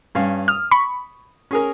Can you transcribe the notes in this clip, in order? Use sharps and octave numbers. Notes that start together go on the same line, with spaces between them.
G2 C#4 F5
D#6 F6
B5 C#6
C#4 G#4 A#4